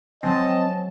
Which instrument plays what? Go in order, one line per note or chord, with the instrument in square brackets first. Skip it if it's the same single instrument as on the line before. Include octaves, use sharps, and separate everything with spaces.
[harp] F#3 G#3 G#4 [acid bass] C4 [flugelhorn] D#5 [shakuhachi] A5